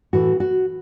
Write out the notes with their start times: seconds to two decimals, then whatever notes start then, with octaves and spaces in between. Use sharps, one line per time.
0.13 A2 E3 F#4
0.40 F#4